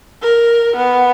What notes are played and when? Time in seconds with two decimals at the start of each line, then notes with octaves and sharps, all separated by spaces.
0.22 A#4
0.76 B3